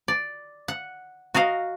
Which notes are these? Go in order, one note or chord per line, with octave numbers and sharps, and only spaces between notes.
D5
F#5
F#4 A#4 D#5 F5